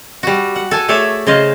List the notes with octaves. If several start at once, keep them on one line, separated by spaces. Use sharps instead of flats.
G3 F#4
F#5
A4 G#5 A5
A3 G#4 C#5 D5 E5
C#3 C5 D#5 F5